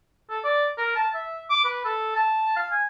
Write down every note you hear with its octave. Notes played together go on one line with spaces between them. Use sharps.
A4
D5
A#4
A5
E5
D6
B4
A4
A5
F5
G#5